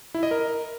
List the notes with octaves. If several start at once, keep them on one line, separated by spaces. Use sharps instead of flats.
E4
D#5
A#4